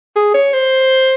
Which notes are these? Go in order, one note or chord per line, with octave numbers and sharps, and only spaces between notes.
G#4
C#5
C5